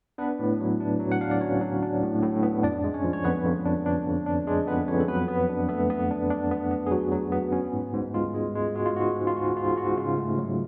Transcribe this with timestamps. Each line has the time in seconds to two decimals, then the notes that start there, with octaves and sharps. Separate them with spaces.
0.18 B3 D4 B4
0.39 A2
0.60 F#3
0.81 D4
1.00 F#3
1.12 F#5
1.21 D4 F5
1.31 D5
1.41 F#3 C#4 C#5
1.61 F#3
1.83 D4
2.02 A2
2.22 A2
2.43 B3
2.63 F2 D4 D5
2.84 G#3
2.94 C#4 C#5
3.04 F3
3.13 C#5
3.24 F2 B3 B4
3.45 F2
3.65 D4
3.86 D4
4.06 F2
4.26 D4
4.47 G#3 D4 G#4
4.67 F2 B3 B4
4.88 F2 C#4 C#5
5.00 A4
5.08 F#3 B3 B4
5.28 B3
5.49 D4
5.69 A3 B3 A4
5.90 B3
6.11 D4
6.30 D4
6.51 B3
6.71 B3
6.86 G#4
6.91 F#3 F#4
7.12 F#3
7.32 B3
7.52 C#4
7.73 G#2
7.94 G#2
8.14 G#3 F4
8.34 G#3
8.55 G#3
8.75 G#3 F#4
8.86 F4
8.95 G#2 F#4
9.16 G#2
9.27 F4
9.36 G#2 F#4
9.56 G#2 F4
9.77 G#2 F#4
9.98 C#3 F4
10.17 A3
10.38 F#3